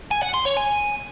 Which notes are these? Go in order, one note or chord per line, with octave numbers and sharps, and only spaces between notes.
G#5
F#5
C6
C#5
G#5